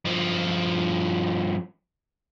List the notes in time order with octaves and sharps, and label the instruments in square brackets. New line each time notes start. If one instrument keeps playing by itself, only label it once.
[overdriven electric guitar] G2 F3